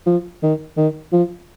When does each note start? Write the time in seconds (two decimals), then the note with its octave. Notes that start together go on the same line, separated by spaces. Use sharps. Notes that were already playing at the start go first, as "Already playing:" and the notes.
0.07 F3
0.43 D#3
0.77 D#3
1.12 F3